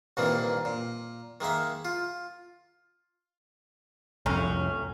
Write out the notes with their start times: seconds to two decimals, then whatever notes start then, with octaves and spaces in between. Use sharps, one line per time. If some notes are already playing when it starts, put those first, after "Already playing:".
0.17 C2 G2 A#2 D#3 E3 A#3
0.65 A#2
1.40 D#3 G#3 A#3 E5
1.85 F4
4.26 C2 F2 A2 C#4 A#5